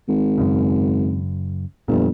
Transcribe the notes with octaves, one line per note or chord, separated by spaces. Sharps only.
G#1
F#2 C#3
G1 F2 A#2